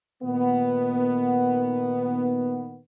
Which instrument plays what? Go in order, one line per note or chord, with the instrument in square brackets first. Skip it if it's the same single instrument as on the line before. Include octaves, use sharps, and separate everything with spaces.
[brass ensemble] A#2 D#3 B3